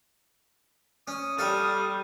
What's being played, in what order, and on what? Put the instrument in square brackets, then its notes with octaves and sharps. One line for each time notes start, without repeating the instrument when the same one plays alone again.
[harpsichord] C#4 [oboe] D#6
[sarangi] G3 [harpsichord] A4 F5